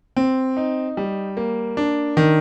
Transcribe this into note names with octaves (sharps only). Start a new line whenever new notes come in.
C4
D#4
G3
A#3
D4
D#3